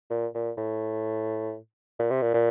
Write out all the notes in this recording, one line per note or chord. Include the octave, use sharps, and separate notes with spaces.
A#2
A#2
A2
A#2
C3
A#2
A#2